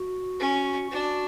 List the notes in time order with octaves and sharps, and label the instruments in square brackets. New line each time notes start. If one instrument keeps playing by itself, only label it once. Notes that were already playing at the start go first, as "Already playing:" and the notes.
Already playing: [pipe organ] F#4
[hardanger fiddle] C#4
[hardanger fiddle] D4 [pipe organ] F#4